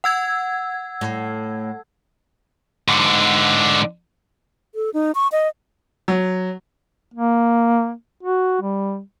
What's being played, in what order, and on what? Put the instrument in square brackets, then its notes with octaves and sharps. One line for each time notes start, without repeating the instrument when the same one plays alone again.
[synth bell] F#5 E6 G#6
[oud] A2
[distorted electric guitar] G#2 D3
[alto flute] A4
D#4
C#6
D#5
[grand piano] F#3
[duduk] A#3
F#4
G3